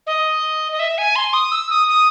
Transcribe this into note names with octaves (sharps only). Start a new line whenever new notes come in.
D#5
D#5
E5
G#5
C6
D#6
E6
D#6
D#6